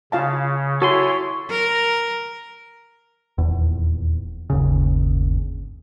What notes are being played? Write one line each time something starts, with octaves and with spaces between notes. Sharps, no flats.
C#3 F4 F5 A5
E4 F#4 A4 C#5 G#5 C6
A#4
D#1 E2
G1 D#2 C#3